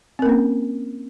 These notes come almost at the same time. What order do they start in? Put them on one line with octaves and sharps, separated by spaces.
C4 A#4 A#3 C#4